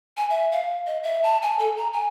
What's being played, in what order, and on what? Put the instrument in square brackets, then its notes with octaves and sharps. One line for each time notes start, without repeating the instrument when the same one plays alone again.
[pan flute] G#5
E5
F5
D#5
E5
A5
G#5
A4
A#5
G#5